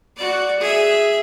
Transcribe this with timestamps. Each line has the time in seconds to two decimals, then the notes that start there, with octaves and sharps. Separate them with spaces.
0.16 F#4 D5
0.60 G#4 E5